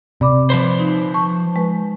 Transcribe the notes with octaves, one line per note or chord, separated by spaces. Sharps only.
C3 D5 B5 D6
F3 B4 C5
D#4
A5 C#6
G#3 B4